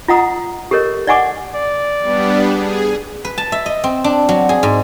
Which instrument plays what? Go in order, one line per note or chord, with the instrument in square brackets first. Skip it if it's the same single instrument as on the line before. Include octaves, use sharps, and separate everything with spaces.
[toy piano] F4 D#5 F#5 A#5 D#6
G4 A4 A#4 C#5 D#5
D5 D#5 F#5 G#5 C#6 D6
[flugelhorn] D5
[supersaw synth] G3 B3 D4
G#4
[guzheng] B4
A5
E5
D#5
C4
D4
F#3
G#4
G#2